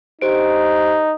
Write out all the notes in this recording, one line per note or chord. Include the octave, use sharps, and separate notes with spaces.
D#4 G4 C5 D7